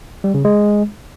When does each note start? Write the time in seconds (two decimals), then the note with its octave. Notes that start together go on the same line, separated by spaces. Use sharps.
0.24 G3
0.34 C#3
0.45 G#3